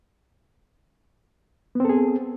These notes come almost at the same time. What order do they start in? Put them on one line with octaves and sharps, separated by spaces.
B3 C4 A4 G#4